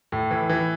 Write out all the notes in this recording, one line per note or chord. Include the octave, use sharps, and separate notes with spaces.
A2
E3
E3